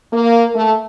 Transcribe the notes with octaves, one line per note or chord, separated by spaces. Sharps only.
A#3
A3